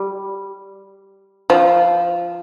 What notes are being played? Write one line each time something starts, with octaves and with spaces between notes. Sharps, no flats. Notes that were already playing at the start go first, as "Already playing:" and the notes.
Already playing: G3
F3